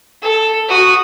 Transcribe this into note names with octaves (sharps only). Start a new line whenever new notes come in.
A4
F#4 D#6